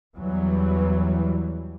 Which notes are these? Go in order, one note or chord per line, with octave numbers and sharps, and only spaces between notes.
E2 E3 F#3 G3